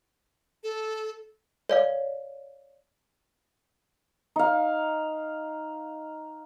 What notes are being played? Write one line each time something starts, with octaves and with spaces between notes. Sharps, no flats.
A4
C#5 D5 F5
D#4 F5